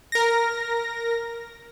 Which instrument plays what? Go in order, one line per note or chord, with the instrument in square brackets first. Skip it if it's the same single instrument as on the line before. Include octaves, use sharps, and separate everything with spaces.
[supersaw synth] A#4 A#6